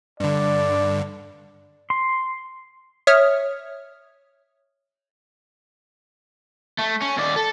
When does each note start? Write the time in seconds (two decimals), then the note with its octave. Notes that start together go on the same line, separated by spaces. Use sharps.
0.20 G2 D3 D5
1.90 C6
3.07 C#5 E5 D#6 F6
6.79 A3
7.02 C#4
7.18 D#2 D5
7.36 A4